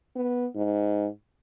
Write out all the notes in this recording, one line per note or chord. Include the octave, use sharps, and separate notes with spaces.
B3
G#2